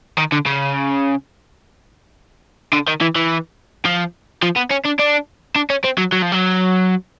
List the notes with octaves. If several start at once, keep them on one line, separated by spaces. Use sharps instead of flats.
D#3
D3
C#3
D3
D#3
E3
E3
F3
F3
B3
C#4
D4
D4
D4
C#4
C4
F#3
F#3
F3
F#3